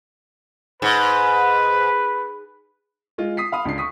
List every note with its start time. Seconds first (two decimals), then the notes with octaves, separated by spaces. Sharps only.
0.82 G#2 B4
3.18 G#3 F4
3.37 D#6 B6 C7
3.52 F5 B5 D#6
3.65 C#2 D4 C7
3.78 C#6 D#6 B6